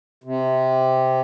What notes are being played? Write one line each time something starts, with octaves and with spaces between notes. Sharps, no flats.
C3